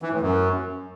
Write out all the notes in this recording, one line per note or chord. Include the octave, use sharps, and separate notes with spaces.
E3
A2
F#2